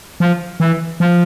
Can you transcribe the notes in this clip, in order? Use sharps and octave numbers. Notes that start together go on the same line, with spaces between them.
F3
E3
F3